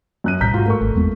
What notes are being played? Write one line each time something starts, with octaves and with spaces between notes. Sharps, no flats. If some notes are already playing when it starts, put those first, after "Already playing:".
F#2 F#6 D#7
B1 A2 G3 A#5 G6 B6
G#2 F4 F#4
A3 A#4 C#6
G#1
E2 G#3 B3